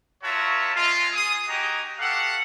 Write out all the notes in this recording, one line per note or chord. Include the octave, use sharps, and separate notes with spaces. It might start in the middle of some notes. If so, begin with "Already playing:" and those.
F4 F#4 A#4 C#5 E5 A5
G#3 F4
G#4 D#6
D#4 F#4 G4 D#5 G#5 A#5
F#4 G4 A4 F5 F#5